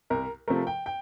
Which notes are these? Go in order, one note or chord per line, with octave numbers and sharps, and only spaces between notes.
C2 A#4
C3 F3 A3 A#4
G5
G5